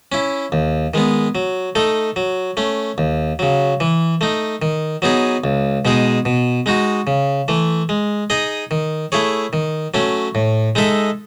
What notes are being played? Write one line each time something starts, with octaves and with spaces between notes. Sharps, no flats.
C#4 E4
D#2
D#3 G#3 B3
F#3
A3 D#4 A4
F#3
A3 C#4
D#2
C#3 F#3
E3
A3 D#4
D#3
F#3 B3 D#4 G#4
C#2
B2 G#3 D#4 G#4
B2
G#3 D#4 F#4
C#3
E3 A3
G#3
D#4 G#4 D#5
D#3
A3 E4 G#4 C#5
D#3
F#3 A3 C#4
A2
G#3 D#4 A4 E5